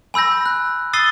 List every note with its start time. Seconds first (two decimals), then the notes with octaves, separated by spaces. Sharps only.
0.14 G#5 B5 E6 G6 A#6
0.46 F#6
0.93 D#6 E6 A6 C7 D#7 G7